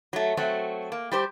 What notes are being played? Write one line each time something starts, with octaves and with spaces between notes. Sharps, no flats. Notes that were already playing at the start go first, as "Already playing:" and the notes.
F#3 A3
F#3 A3 C4 F#4
A#3
G3 G4 C5